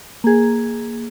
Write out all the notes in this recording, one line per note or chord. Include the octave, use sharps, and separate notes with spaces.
A#3 G#4